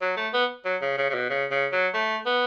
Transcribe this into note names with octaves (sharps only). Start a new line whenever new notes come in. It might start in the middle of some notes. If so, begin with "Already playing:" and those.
F#3
A3
B3
F#3
C#3
C#3
C#3
B2
C#3
C#3
F#3
A3
B3